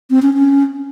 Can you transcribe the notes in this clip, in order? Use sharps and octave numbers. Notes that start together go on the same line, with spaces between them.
C4
C#4
C#4